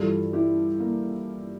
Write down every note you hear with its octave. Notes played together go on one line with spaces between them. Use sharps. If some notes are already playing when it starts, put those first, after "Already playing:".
Already playing: G2 E3 G3 F4 A4
E4 G4
A#3